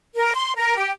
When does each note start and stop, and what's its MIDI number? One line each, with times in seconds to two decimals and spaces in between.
0.17 0.32 70
0.33 0.52 84
0.57 0.74 70
0.77 0.90 67